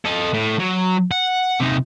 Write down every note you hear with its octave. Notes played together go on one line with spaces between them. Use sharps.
A4 D#5
A2
F#3
F#5
C3 D#4